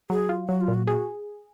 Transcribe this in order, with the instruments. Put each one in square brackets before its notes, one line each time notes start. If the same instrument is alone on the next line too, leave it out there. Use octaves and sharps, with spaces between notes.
[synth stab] F#3 [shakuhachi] G#4
[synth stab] F4
[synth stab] F#3 [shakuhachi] F#4
[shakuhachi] F4
[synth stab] A#2
[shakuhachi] F#4
[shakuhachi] F#4 [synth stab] G#4